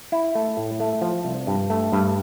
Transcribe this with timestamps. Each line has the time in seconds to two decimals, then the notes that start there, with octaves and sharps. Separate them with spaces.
0.12 E4
0.35 A3
0.57 A2
0.80 A3
1.02 F3
1.25 C2
1.47 G2
1.70 A3
1.92 G2